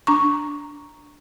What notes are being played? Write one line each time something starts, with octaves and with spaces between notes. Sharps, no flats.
D4 A#5 C#6